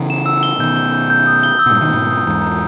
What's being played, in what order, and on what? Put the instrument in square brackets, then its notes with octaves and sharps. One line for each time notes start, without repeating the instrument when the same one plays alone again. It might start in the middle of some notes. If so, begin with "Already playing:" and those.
Already playing: [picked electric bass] C#3 E3
[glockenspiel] E7
E6
G7
[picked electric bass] B2 D#3 [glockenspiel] G6
[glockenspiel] G7
G6
G6
D#6
G7
E6
[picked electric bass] B2
G2 A#2
[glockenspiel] E6
[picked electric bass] B2 D#3
A#2
[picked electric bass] G#2 B2 [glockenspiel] D#6
[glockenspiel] D#6
[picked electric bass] E2 G#2 [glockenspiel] A#5
[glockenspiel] A#5